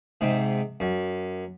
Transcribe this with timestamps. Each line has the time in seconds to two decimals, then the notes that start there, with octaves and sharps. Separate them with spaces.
0.21 G#2 C3
0.80 F#2